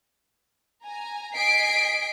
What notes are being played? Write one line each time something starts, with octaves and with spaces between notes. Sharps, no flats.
G#5 A#5
D#5 G#5 B6 C7 D7